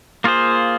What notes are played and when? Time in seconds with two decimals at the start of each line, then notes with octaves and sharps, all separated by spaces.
0.24 A#3 F4 G#4 C5